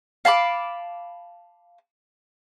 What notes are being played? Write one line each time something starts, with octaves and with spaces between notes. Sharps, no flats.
F5 A5 B5 D6